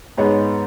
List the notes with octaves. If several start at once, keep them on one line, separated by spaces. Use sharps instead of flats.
G#2 G#3 B3 D#4 C#5